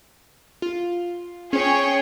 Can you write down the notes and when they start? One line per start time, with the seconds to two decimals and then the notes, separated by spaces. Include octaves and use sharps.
0.62 F4
1.53 C#4 G#4 C#5 G5